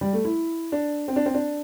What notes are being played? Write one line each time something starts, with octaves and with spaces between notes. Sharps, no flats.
G3
A3
E4
D4
C4
D4
C4
D4